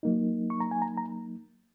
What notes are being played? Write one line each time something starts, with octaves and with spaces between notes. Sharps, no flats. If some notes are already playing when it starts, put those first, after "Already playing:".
F#3 A#3 D#4
C#6
A#5
G#5
A#5
A#5